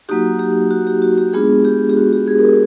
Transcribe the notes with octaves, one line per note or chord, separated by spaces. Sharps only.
F#3 A#3 D#4 F#4 G4
G4
F#4
G4
F#4
G4
G#3 B3 D4 F4 G#4
G4
G4
F#4
G4
G#4
A#4